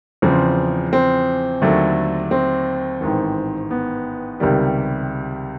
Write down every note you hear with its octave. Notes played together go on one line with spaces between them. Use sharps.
E2 C#3 F3 C4
C4
D#2 D3 F#3 A3
C4
A1 G#2 D#3
B3
C#2 C3 D#3 G3